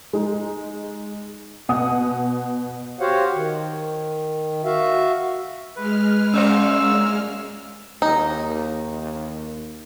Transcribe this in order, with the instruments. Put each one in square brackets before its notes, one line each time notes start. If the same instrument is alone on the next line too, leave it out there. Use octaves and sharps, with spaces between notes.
[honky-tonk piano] G#3 D#4
B2 F#5 D#6
[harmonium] F#4 G4 C5 C#5 F5 F#5
D#3
F#4 E5 F5
[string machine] G#3 F6 [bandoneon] B4
[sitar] F#2 A#2 C5 [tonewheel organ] C#4 [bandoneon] E6
[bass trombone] D#2 [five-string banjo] D#4